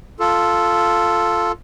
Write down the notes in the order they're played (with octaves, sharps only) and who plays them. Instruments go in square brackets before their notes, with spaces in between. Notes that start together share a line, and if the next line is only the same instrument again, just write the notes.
[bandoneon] F4 A4